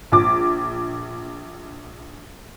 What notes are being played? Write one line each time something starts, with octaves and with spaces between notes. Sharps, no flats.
A#1 D6